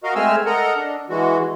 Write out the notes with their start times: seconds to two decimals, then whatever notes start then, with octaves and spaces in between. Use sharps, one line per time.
0.04 F#4 A#4 D#5 F5
0.15 G#3 A3 C4 G#5 E6 F6
0.46 A4 A#4 D#5 F#5 A#5
0.76 D4
1.10 E3 G#3 F#4